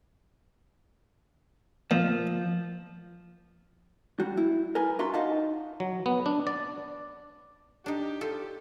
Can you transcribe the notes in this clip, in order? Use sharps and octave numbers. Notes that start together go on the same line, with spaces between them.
A#2 F3
G3 F#4
E4
A#4 B4 G#5
D4 F4 F#4 E5 A#5 C6
D#4 F4 D#5 F5 F#5 A5
F#3
B3
D4
D5
D4 D#4 G4
F4 A4